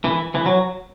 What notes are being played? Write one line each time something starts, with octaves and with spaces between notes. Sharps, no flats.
E3
E3
F#3